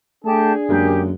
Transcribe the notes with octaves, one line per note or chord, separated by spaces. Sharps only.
A3 D4 G4 G#4 A5
F#2 D3 G#3 A#3 G4